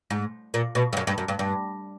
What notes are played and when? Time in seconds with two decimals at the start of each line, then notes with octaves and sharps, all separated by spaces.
0.10 G#2
0.54 A#2
0.75 B2
0.93 G2
0.97 F#2
1.07 G2
1.18 F#2
1.28 G2
1.39 G2